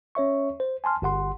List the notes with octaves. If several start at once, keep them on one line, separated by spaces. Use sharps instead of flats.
C#4 C#5 E5 C#6
C5
G#5 A5 C6 F6
G1 G4 F#5 C6